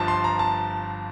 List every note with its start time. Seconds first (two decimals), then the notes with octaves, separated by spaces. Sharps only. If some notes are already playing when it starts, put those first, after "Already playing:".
Already playing: G1 G2 F3 A5
0.08 C6
0.24 A#5
0.39 A5